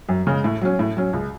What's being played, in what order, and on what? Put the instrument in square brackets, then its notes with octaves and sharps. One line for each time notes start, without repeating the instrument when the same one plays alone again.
[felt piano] F#2
C#3 G#3
A2
F#3 C#4
A2
F#3 C#4
C#2